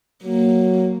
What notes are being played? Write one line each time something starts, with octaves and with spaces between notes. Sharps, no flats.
F#3 A#3